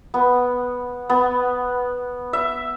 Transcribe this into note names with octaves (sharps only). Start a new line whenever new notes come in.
B3
B3
E5